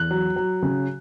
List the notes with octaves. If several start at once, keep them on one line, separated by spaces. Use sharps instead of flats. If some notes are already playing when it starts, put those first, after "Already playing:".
Already playing: E2 F#6
F#3
F#3
C#3